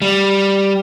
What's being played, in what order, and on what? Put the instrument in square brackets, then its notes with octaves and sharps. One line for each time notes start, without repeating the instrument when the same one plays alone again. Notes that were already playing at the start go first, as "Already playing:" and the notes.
[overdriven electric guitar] G3